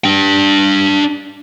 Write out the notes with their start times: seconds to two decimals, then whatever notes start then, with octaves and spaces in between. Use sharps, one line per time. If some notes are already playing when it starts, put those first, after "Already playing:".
0.04 D4 G5